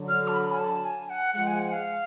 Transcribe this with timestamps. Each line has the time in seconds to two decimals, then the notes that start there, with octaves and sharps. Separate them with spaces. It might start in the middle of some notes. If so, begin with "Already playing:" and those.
Already playing: D3 F#3
0.09 F6
0.28 A5
0.33 B5
0.52 G#5
0.59 A5
0.85 G#5
1.10 F#5
1.35 F3 G#3 F#5
1.47 G#5
1.60 F#5
1.72 F5